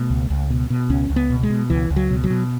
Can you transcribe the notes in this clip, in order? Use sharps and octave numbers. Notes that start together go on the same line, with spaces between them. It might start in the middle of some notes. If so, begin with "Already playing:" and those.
Already playing: B2 A3
C#2
C#2
B2
B2
C#2 C#4
C#2
B3
B2
G#3
B2
C#2 E3
C#2
F#3
B2
F#3
B2